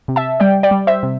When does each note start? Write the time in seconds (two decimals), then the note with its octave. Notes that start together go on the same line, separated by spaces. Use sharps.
0.08 C3
0.16 E5 A5
0.40 G3 D5 G5
0.63 D5 G5
0.71 G3
0.87 C5 E5
1.03 C3